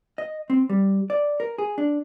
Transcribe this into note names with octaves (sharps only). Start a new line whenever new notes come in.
D#5
C4
G3
D5
A#4
G#4
D4